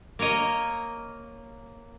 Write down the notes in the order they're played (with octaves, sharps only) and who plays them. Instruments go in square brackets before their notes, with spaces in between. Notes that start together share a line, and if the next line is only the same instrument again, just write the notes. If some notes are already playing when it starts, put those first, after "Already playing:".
[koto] A#3 A#4 C#5 D#5